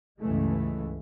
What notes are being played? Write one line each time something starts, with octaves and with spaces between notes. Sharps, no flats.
C#2 G2 C#3 E3 G#3 A3